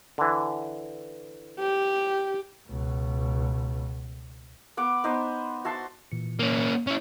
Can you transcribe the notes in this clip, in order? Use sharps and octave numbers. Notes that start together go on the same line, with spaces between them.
D3 E3
G4
C#2 B2
B3 F#5 D6
B3 D#4 C5 D#5
F#4 E5 A5 C6
A#2 E3 C#7
A#3 C#4
C#4 E4